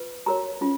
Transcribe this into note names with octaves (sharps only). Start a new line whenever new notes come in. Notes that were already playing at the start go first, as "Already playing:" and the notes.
Already playing: F4 B4
F#4 A#4 C#5 A#5
C#4 F4